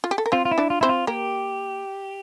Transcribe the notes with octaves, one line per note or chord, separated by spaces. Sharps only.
F4
G4
A4
A#4
C4 F4 C5
F4
E4
D4 D5
F4
C4 E4 C5
F4
A#3 G4 A#4